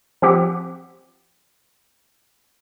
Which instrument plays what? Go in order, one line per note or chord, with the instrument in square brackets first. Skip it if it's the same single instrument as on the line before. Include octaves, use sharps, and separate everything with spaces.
[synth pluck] F3 C4 G4 F#5